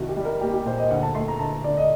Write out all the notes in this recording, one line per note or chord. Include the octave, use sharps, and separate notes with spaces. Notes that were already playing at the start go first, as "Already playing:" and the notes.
Already playing: C2 D#3 F#4
G4
G3
A#4
A#3 G4
G4
A#2 C5
D#5
D2 F#5
A5
A3 C6
A#5
D2 A5
D3 D5
D#5